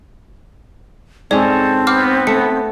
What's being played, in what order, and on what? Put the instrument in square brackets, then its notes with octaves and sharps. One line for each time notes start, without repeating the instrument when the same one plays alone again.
[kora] G#2 C#4 [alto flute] C4 [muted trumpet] A4 [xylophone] D5
[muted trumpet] B3 [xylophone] F#5 D6 F6
[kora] A3 A4 [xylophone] C#7